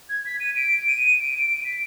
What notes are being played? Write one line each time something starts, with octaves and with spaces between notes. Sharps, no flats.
G#6
B6
D#7
D7
D#7
D7
D7
D7
B6